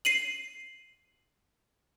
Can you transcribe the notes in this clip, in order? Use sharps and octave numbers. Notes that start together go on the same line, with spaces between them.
C7 D#7 F#7